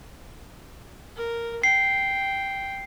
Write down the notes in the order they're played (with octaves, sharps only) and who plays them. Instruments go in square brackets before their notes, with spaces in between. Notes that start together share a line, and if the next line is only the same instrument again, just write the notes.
[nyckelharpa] A#4
[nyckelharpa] G5 [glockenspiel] C7